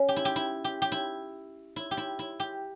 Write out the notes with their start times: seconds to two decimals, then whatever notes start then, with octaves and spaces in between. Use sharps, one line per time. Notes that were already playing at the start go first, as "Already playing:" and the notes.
Already playing: C#4
0.09 G4
0.16 E4
0.25 G4
0.36 E4
0.64 G4
0.82 G4
0.92 E4
1.76 E4
1.91 G4
1.97 E4
2.19 E4
2.40 G4